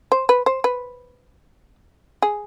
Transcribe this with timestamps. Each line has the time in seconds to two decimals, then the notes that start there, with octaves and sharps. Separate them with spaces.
0.12 C5
0.29 B4
0.46 C5
0.64 B4
2.22 G#4